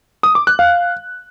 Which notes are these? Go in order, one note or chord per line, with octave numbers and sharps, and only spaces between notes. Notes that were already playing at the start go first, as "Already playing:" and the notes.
D#6
D6
F#6
F5